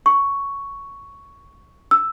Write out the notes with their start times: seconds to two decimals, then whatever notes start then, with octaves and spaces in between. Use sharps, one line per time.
0.06 C#6
1.91 E6